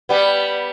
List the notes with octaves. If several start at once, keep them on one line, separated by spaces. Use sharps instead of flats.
G3 B3